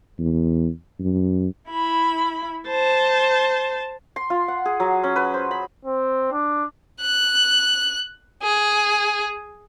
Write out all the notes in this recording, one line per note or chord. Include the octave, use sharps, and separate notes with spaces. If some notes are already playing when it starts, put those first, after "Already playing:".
E2
F#2
E4 B5
C5 A5
C6
F4
F#5
G#4
F#3
C#4
B4
C5
B5
C4
D4
F#6
G#4